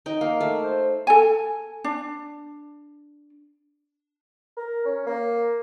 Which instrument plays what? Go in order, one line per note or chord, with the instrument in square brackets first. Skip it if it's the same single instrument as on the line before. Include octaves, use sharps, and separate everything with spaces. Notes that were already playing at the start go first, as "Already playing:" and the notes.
[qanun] D#4 G5
[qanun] A#3 [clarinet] F5
[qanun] A3
[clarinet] C5
[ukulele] A4 G#5
D4
[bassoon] A#4
C#4
A#3